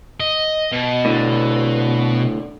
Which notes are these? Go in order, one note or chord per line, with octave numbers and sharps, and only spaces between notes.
D#5
B2
A2 D3